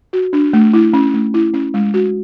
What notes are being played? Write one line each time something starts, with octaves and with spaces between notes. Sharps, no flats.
F#4
D4
A3
E4
C#4
A3
E4
C#4
G#3
F#4